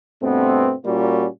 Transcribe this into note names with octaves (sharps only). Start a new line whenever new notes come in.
G2 B2 A3 B3 C4
A#2 G3 A#3 C#4 F4 F#4